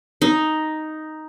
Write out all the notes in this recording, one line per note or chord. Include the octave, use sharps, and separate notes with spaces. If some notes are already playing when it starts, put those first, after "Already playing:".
D#4